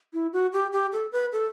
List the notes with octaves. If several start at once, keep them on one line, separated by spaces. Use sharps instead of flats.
E4
F#4
G4
G4
A4
B4
A4